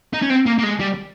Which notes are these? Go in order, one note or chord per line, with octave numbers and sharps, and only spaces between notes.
D#4
C#4
C4
A#3
A#3
G#3
G3